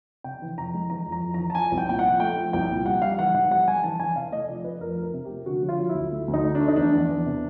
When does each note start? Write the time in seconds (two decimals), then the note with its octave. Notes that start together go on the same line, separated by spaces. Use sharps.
0.24 C3 G5
0.42 E3
0.58 F2 A#5
0.74 G#3
0.90 E3 A#5
1.06 F2
1.12 A#5
1.23 F2
1.34 A#5
1.40 E3
1.50 A5
1.55 F3 G#5
1.72 C2
1.78 G5
1.89 A#2 G5
1.99 F3 F#5
2.20 A3 G5
2.37 F3
2.53 C2 G5
2.70 A#2
2.85 G3 F#5
3.02 G3 F5
3.19 E3 F#5
3.34 G#2 F#5
3.51 G3 F#5
3.68 G3 G#5
3.83 E3 A5
4.00 E3 G#5
4.15 C3 F5
4.32 A3 D#5
4.48 F3 D5
4.64 A3 B4
4.81 F2 A#4
4.97 F3
5.03 A#4
5.14 C3
5.25 A3 G4
5.46 D3 F#4
5.63 F#3
5.69 F4
5.79 F#3
5.89 E4
5.95 D2
6.12 A3
6.28 D2
6.34 D#4
6.43 A3
6.55 D4
6.60 A3
6.68 D#4
6.76 E2 D4
6.92 E2
7.10 E2
7.26 C3